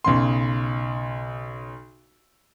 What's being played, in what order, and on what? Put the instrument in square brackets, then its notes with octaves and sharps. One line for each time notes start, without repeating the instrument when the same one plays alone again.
[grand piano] B1 C#3 C6